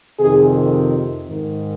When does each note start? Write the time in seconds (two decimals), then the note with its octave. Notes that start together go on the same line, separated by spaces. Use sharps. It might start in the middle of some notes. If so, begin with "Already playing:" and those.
0.19 F2 C3 D#3 G#4
1.29 G#2 D#3